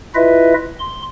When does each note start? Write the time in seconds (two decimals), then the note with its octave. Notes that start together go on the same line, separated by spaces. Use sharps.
0.15 E4 F4 B4 D#5 E5
0.79 C6